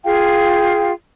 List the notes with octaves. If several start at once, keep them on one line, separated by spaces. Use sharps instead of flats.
F4 G#4 F5 G5